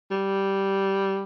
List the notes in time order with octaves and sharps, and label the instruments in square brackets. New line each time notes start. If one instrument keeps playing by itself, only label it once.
[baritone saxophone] G3